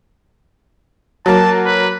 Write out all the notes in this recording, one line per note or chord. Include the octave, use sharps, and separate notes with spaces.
F#3 A#3 A5
B4